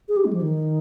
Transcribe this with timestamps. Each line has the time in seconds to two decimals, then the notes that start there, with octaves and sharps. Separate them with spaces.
0.09 G#4
0.17 G4
0.25 G#3
0.33 F3
0.41 D#3